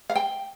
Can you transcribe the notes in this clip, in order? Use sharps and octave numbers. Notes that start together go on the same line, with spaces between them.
F5
G5